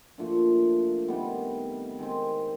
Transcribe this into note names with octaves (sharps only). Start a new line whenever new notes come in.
A#2 F3 A3 D4
C3 D#3 G3 B3
D#3 G#3 C4